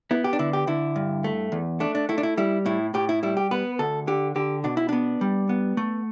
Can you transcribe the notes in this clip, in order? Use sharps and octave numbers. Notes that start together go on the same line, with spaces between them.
B3 E4
G4
D4
D3 E4
G4
D3 E4
G2
A3
E2
A3 D4
D4
A3 E4
D4
E4
G3 E4
A2 E4
A2 G4
E4
G3 E4
G4
B3 B4
D2 A4
D3 G4
D3 G4
B2 D4
E4
B3 D4
G3
B3
A3